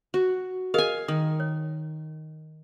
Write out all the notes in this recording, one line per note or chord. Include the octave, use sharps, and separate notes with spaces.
F#4
G#4 A#4 D#5 F5 G#5
D#3 D#6
C#5